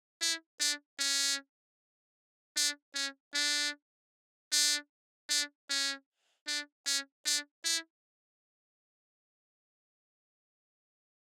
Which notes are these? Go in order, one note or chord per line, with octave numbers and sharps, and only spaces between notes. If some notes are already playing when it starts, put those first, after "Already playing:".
E4
D4
C#4
D4
C#4
D4
D4
D4
C#4
D4
C#4
D4
E4